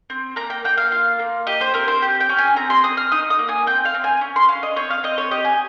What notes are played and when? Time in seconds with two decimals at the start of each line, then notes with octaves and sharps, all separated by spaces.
0.10 C4
0.36 A#3 A#5
0.50 G5
0.64 A#3 G5
0.78 F5
0.92 F4
1.19 A#3
1.47 G4 D#5
1.61 C5
1.74 C4 A#4
1.88 C5
2.02 G4
2.20 G5
2.29 C#4
2.38 G#5
2.56 C4 A#5
2.70 C6
2.84 C4 D#6
2.97 F6
3.12 D#4 D#6
3.30 D#6
3.39 A#3
3.49 G#5
3.67 C4 G5
3.85 F5
3.94 C4
4.04 G#5
4.21 C#4
4.36 C6
4.49 C#4 F5
4.63 D#5
4.76 C4 C#5
4.90 F5
5.04 C4 D#5
5.18 C#5
5.31 G4 D#5
5.45 G#5